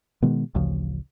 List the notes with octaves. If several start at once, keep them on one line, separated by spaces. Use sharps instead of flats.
B2 D#3 G#3 B3
A1 D2 C#3 F3